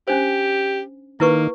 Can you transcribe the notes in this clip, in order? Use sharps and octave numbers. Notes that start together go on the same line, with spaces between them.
C#4 D4 G4 C5
D#3 A#3 D#4 E4 B4 C#6